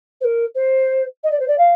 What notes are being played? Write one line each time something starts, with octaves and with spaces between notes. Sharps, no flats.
C5
A#4
C5
D#5
D5
C5
D5
F5